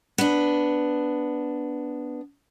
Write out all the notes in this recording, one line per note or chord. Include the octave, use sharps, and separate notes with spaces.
B3 D4